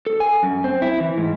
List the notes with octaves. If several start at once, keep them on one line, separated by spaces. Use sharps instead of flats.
A4
G#5
F#2
C4
E4
E3
G#2